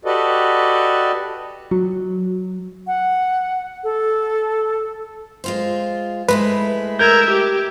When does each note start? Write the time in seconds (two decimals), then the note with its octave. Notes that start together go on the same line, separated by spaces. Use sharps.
0.05 F#4 G4 A4 B4 D5 D#5
1.71 F#3
2.87 F#5
3.84 A4
5.44 G#3 F4 C5
6.28 G#3 A3 E4 B4
6.99 A#4 E5 G6 G#6
7.30 G4